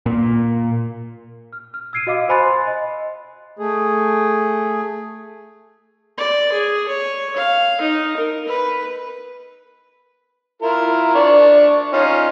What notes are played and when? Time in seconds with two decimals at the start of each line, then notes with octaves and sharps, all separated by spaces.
0.06 A#2
1.53 F6
1.74 F6
1.93 E6 G#6 C7 D7 D#7
2.07 F#4 D#5 F5 D6 E6
2.29 C5 G#5 B5 C6 F#6 A6
2.67 D#5
3.59 A3 G#4
6.18 D5
6.53 G#4
6.88 C#5
7.36 F5
7.81 D#4
8.17 A#4
8.47 B4
10.62 E4 F4 A#4
11.15 D4 D5 C#6
11.93 C#4 D#4 F4